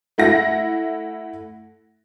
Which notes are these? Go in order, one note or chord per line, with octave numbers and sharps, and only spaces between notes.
A3 E4 F#5 A#6